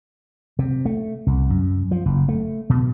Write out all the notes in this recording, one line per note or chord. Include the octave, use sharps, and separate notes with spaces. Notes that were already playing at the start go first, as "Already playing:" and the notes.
C3
A3
C2
F#2
F3
F#1
A3
B2